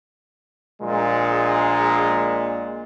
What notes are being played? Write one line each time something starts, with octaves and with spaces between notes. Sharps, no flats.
A#1 A#2 G#3